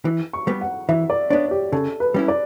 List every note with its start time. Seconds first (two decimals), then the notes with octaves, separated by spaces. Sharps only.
0.05 E3
0.33 C#6
0.47 G3 B3
0.61 F#5
0.89 E3 E5
1.10 D5
1.30 B3 D4 C#5
1.51 G4
1.72 C#3 A4
2.00 B4
2.14 G3 C#4 E4
2.28 D5